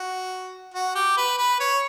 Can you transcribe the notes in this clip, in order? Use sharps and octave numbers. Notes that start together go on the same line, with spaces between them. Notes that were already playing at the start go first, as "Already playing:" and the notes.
Already playing: F#4
F#4
G4
B4
B4
C#5